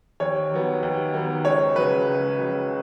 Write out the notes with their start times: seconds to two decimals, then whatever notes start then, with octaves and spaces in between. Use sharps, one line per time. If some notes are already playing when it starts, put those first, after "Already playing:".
0.20 D#2 C#5
0.51 D#3 F#3 B3
0.83 D#2
1.14 D#3 F#3 B3
1.45 C#2 C#5
1.76 C#3 F#3 B4
2.07 C#2
2.38 C#3 F#3